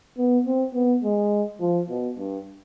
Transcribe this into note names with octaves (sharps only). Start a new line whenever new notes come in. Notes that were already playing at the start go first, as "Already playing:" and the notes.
B3
C4
B3
G#3
F3
B2
G2